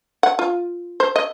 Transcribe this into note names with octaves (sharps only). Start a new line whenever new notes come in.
F#5
F4
C5
D#5